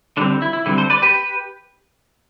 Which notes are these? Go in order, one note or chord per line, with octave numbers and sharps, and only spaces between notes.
D3 G3 C4 D4
E4
E4
D3 G3 C4 E4
A4 C5
B4 D5
G4 B4